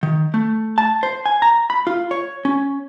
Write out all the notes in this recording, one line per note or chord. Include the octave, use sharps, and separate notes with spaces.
D#3
A3
A5
C5
G#5
A#5
B5
F4
C#5
C#4